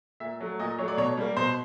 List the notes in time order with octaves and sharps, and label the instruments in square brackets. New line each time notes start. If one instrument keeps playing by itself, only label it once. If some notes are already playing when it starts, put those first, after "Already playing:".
[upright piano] A#2 E5
F#3 A3
A#2 D#5
F#3 A3 C#5
D5
B2 C#5
G3 A#3
B2 C5